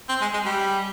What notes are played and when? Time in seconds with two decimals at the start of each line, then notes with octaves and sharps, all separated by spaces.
0.09 C4
0.21 G#3
0.34 G#3
0.45 G3